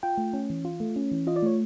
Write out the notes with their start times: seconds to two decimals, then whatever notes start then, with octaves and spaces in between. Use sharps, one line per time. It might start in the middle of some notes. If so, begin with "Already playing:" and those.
0.03 F4 G5
0.18 A3
0.34 C#4
0.50 E3
0.65 F4
0.80 A3
0.96 C#4
1.12 E3
1.27 F4 D#5
1.36 D5
1.43 A3 C#5